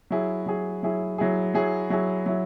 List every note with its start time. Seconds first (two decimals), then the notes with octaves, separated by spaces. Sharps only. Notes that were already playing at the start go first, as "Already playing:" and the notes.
0.11 F#3 E4 G#4
0.46 F#3 E4 G#4
0.83 F#3 E4 G#4
1.18 F#3 E4 G#4
1.54 F#3 E4 G#4
1.90 F#3 E4 G#4
2.26 F#3 E4